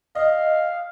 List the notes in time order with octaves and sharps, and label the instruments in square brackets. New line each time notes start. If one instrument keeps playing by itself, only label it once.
[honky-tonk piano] D#5 [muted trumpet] F5